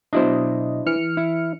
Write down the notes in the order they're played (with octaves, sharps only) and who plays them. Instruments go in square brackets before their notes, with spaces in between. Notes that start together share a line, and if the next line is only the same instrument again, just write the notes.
[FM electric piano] B2 F#3 D#5 [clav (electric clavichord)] D4 E4 C5
[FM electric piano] E3 F6 C#7
[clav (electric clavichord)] E4